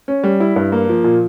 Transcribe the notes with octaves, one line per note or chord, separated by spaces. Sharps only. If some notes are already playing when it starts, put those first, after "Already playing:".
C#4
G3
E4
G2
A#3
F3
A#2